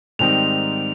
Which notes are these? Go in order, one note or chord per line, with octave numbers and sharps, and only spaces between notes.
G#2 D#3 G3 C4 D#4 F7